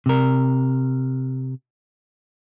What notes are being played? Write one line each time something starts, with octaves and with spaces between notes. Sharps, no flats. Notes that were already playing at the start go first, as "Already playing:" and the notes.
C3 A#4